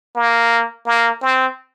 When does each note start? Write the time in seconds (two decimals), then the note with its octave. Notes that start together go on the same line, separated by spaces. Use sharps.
0.15 A#3
0.86 A#3
1.22 C4